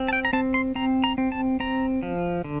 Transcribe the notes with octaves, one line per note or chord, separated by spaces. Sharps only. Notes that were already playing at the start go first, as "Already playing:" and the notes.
Already playing: C4
A5
G5
A#5
C4 A5
C6
C4 A#5
A#5
C4
A5
C4 A#5
F3
D3